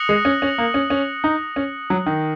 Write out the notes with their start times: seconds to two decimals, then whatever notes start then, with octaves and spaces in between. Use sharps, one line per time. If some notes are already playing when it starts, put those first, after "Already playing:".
Already playing: D#6 F#6 A#6 C#7 F#7
0.09 G#3
0.25 C#4
0.42 C#4
0.58 A#3
0.74 C#4
0.90 C#4
1.24 D#4
1.56 C#4
1.90 F#3
2.06 D#3